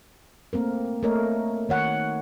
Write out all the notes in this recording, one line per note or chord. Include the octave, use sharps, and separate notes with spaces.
A3 A#3 C4 A#4
A3 A#3 A#4 C#5 D#5
D#3 C#5 F#5